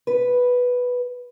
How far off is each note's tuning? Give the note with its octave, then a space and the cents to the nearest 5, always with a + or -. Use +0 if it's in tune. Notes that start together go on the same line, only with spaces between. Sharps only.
B4 +0